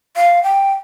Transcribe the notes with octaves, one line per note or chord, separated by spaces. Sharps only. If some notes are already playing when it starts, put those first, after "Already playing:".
F5
G5